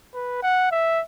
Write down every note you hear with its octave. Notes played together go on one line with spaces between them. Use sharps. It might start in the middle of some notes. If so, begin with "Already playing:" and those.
B4
F#5
E5